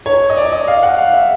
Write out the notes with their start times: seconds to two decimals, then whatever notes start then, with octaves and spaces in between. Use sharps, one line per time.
0.06 C#5
0.29 D#5
0.37 D5
0.52 D#5
0.68 F5
0.83 F#5
0.98 F5
1.14 E5